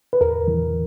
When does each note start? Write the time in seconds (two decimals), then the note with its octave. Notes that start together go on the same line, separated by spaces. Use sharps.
0.13 B4
0.21 E2 A#4
0.48 E3